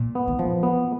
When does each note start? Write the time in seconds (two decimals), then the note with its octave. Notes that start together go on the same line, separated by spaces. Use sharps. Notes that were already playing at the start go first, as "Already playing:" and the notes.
Already playing: A#2
0.15 B3
0.27 D#3
0.39 E3 F3
0.63 B3